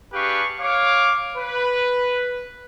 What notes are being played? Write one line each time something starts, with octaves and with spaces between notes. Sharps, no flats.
D4 G4 G#4 B4 F5 C#6
C#5 F5 D6
B4